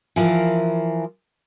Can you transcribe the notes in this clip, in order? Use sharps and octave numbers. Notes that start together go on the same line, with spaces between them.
E3 F3 A#4